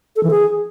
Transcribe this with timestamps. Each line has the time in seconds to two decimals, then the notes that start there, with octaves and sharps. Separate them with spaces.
0.16 A4
0.23 E3
0.30 G#4